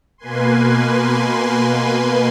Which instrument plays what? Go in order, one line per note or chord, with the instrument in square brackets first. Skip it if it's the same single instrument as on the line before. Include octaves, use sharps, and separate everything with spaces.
[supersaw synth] B2 A#3 B4 G#5 C6